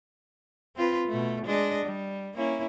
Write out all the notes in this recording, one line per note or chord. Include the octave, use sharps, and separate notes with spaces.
C4 F4 B4
B2 A3
G#3 D4 D#5
G3
A#3 C#4 E4